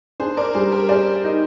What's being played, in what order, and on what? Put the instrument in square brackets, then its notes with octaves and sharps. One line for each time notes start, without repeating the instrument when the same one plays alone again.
[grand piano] D4 [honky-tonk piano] G#4 C5
[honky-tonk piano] A#4 D5
[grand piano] G3 [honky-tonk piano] G#4 C5
[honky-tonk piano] G4 A#4
[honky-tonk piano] G#4 C5 [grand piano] D5
[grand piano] D#4